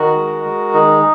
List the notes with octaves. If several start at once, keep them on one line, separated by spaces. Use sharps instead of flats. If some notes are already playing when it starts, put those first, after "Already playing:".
Already playing: D#3 F#4 A#4
G#3
G#3
D#3 D#4